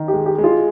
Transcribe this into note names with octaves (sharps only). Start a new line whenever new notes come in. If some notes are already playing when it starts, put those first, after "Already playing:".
Already playing: D#3
G4
G#3
G4
G#3
F4